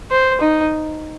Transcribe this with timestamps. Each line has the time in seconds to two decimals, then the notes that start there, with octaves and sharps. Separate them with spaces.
0.11 C5
0.41 D#4